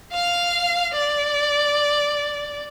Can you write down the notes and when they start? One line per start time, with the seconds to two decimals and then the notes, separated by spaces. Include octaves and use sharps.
0.12 F5 F6
0.94 D5